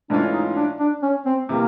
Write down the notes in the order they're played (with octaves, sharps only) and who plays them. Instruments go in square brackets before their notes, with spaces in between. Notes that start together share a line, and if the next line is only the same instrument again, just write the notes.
[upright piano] G#2 E3 A3 C#4 F4 [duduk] D4
[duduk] D#4
D4
D4
C#4
C4
[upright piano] C3 E3 G3 [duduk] A#3